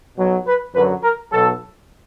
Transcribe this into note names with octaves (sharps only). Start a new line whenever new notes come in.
B1 B2 F#3
B4
F#2 D3 F#3 B4
A#4
B1 B2 F#3 A4